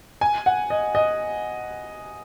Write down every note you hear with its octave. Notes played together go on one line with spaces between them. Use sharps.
G#5
F#5
D#5
D#5